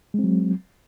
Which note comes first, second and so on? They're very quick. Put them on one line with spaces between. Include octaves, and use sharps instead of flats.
G#3 C4 F#3